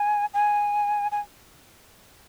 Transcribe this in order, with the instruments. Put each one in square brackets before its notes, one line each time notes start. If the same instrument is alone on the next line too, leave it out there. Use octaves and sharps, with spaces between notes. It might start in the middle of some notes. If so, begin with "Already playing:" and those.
Already playing: [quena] G#5
G#5
G#5